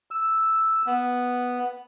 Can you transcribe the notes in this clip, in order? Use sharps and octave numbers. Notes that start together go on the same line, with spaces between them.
E6
B3